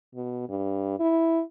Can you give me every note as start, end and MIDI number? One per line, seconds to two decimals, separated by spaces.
0.15 0.44 47
0.49 0.98 43
1.00 1.42 64